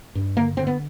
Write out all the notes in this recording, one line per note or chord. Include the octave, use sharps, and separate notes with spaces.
G2
D3 A#3
D3 C4
B3